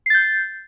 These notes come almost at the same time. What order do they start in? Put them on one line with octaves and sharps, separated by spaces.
C7 A6 G6